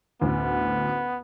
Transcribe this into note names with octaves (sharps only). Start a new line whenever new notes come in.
A1 D2 B3